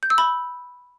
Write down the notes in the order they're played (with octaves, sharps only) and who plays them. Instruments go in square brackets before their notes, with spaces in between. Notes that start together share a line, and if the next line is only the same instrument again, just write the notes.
[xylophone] G6
E6
B5